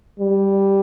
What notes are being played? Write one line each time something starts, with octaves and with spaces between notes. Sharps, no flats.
G3